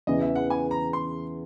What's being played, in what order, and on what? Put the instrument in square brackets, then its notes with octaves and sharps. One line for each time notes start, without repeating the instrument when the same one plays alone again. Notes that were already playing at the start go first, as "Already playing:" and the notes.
[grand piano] E2 C#3 E3 [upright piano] D#5
[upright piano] E5
F#5
G#5
A#5
C6